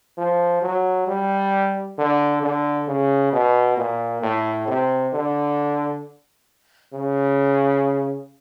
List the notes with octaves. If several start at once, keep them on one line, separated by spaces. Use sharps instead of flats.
F3
F#3
G3
D3
D3
C#3
B2
A#2
A2
C3
D3
C#3